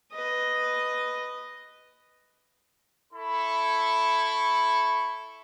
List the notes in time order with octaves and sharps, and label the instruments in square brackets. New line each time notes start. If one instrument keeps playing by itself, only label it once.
[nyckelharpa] B4 D#5
[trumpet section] E4 A4 B5 C#6